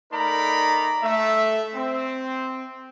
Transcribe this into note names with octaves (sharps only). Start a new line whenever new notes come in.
A3 D#4 A#4 D5 A#5 B5
A3 E5
C4